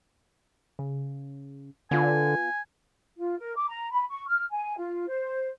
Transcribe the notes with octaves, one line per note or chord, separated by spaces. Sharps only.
C#3
D3 B3 F4 G#5
F4
A#4
D6
A#5
B5
C#6
F6
G#5
F4
C5